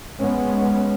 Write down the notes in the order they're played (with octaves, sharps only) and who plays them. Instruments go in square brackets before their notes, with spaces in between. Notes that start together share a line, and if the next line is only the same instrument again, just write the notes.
[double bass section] G#3 B3 C#4